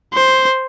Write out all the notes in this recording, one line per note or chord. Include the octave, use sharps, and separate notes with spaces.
C5